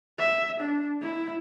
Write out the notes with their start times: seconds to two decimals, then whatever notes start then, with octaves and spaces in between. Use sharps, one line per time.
0.19 E5
0.60 D4
1.01 E4